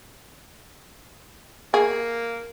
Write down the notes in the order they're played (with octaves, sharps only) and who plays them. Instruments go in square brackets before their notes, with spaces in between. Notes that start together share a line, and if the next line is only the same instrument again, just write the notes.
[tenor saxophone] A#3 [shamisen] G#4